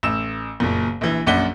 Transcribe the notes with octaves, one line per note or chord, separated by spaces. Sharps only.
A1 E6 E7
F#1 A#2
A#1 E3
A#1 F#2 D5 F#5 B6 G7